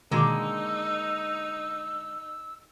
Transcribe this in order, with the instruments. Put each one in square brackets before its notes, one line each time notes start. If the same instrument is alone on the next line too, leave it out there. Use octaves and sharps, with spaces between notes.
[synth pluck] B2 D#3 [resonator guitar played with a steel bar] D3 G#3 A#3 [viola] D#4 [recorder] E6